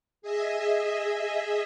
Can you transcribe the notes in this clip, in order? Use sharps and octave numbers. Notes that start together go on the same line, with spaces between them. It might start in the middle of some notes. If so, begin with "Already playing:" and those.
G#4 D#5 E5